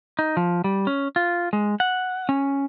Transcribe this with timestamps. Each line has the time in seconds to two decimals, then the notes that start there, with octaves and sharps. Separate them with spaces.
0.19 D#4
0.37 F3
0.64 G3
0.87 C#4
1.16 F4
1.53 G#3
1.80 F#5
2.29 C#4